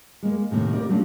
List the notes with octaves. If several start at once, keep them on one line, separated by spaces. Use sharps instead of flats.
G#3 A#3
A2 C3 D#3 A#3
G4 A#4 D5
F#3 A3 C#4 D4 F4